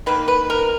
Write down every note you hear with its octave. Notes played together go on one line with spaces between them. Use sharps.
D#3 A#3 B4
B4
A#4